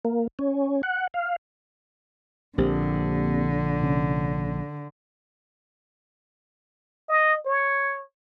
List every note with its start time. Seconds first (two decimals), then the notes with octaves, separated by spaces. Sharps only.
0.05 A#3
0.39 C#4
0.83 F#5
1.14 F5
2.58 A#1 D3 A#3 C4 G4
3.82 C3 C#4
7.09 D#5
7.46 C#5